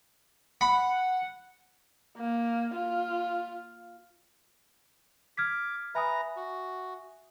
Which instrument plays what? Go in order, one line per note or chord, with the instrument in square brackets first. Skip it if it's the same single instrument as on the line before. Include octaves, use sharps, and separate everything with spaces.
[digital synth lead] F#5 [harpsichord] B5
[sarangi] A#3
F4
[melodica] D6 [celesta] F6 G#6 B6
[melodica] B4 A#5 [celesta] E5 G#5 D#6
[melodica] F#4